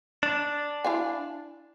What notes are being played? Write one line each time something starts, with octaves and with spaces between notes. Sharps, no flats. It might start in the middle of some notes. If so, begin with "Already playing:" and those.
D4
E4 F5 G#5